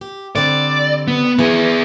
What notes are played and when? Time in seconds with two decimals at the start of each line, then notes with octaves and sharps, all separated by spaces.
0.01 G4
0.36 D3 G3 C4 D5
1.07 B3
1.39 E3 B3 G#4